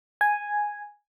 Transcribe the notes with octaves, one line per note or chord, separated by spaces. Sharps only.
G#5